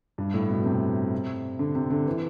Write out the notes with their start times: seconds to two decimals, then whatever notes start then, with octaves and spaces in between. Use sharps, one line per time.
0.18 G2
0.34 A2
0.49 B2
0.65 C3
1.59 D3
1.75 C3
1.90 D3
2.06 E3